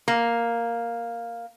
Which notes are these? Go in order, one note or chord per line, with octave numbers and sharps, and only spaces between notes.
A#3